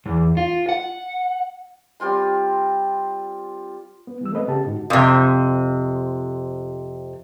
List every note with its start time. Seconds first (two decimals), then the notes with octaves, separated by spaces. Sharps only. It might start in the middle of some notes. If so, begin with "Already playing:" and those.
0.06 E2
0.37 F4
0.69 F#5
2.00 G3 C4 F4 C6
4.07 B3
4.21 E3 G3 E6
4.32 A3 B3 C4 B4 D#5
4.48 C#3 G4 A5
4.66 G#2 D3 D#4 F#4
4.90 F2 C3